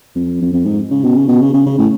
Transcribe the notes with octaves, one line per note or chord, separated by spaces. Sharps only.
F2
F2
F2
G#2
C#3
B2
C#3
B2
C#3
C#3
C#3
A2